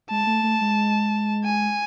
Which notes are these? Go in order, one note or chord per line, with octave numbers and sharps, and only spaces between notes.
G#3 A5
A3
A3
G#3
G#5